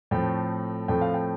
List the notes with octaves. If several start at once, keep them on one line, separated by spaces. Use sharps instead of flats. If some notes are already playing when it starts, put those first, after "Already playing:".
A2 F3 A3 C4 G5
A2 F3 A3 C4 G5
F5
G5